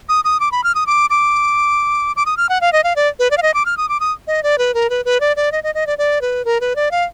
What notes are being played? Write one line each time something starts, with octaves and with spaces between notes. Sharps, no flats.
D#6
D#6
D6
B5
F6
D#6
D6
D6
D6
D#6
F6
F#5
F5
D#5
F5
D5
B4
D5
F5
D#5
D6
F6
D#6
D6
D#6
D#5
D5
B4
A#4
B4
B4
D5
D5
D#5
D#5
D#5
D5
D5
B4
A#4
B4
D5
F5